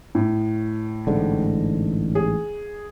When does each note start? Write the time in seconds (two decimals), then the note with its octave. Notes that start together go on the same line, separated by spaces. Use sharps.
0.15 A2
1.07 A1 G#2 D3
2.15 G#4